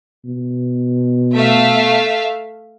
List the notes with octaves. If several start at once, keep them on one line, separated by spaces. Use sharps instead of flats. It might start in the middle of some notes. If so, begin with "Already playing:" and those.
B2
A3 E5 F5